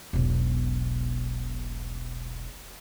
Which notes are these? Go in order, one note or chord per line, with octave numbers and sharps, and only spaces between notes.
E1 B1